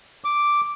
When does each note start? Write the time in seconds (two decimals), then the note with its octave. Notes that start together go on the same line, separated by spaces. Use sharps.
0.24 D6